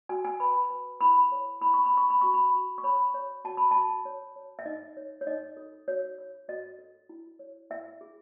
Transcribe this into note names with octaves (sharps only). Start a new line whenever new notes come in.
F#4 G#5
G#5
B4 B5
B4
E4 B5
C#5
E4 B5
C#6
B5
A4 C#6
B5
F#4 C#6
B5
F#4
C#6
C#5 B5
C#5
F#4 A5
B5
F#4 A5
C#5
C#5
E5
D#4 D#5
C#5
C#5
D#4 D#5
A4
F#4 C#5
C#5
F#4 D#5
A4
E4
C#5
E4 E5
G#4